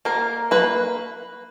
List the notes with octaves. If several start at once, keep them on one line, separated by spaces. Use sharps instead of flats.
A#3 A#4
A#3 B4